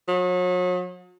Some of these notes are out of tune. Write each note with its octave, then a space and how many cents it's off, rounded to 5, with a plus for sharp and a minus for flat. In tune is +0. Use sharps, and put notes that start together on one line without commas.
F#3 -40